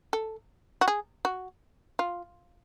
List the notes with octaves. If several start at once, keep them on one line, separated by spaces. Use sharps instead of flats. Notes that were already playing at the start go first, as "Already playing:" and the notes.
A4
F#4
G#4
F#4
F4